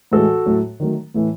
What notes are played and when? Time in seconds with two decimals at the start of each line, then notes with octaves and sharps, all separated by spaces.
0.12 A2 E3 G#3 F#4 A4
0.46 A2 F#3 A3
0.80 D#3 F#3 A3
1.14 A2 E3 A3